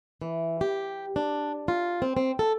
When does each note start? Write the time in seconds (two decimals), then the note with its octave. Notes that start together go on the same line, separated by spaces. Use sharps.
0.22 E3
0.61 G4
1.16 D4
1.68 F4
2.02 C4
2.17 C4
2.39 A4